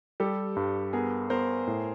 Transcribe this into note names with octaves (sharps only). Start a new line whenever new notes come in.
G3 G4 A4
G2
B3 G#4 A#4
B3 A#4 C5
A2